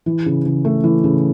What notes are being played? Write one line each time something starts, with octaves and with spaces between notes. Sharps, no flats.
E3
C#3
C#3
A3
E3
C#3